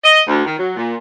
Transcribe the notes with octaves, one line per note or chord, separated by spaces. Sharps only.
D#5
D2
D#3
F#3
A#2